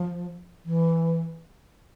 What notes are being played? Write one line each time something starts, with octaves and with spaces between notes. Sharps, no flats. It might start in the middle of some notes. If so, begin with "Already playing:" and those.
Already playing: F3
E3